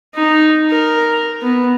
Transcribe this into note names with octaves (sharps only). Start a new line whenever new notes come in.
D#4
A#4
B3